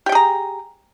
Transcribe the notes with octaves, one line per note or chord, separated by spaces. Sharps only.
G4 G#4 G5 A#5